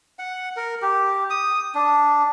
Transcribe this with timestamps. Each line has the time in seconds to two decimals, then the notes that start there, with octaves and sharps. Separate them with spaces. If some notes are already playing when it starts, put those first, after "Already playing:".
0.19 F#5
0.57 A#4
0.82 G4
1.30 D#6
1.75 D4